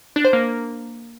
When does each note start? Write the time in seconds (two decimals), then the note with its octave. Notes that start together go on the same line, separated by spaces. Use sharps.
0.16 D4
0.25 C5
0.33 A#3